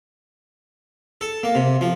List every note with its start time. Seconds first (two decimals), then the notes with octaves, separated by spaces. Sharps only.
1.21 A4
1.43 A#3
1.55 C3
1.81 F3